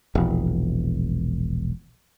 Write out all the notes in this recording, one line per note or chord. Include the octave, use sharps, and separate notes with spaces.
E1 A#1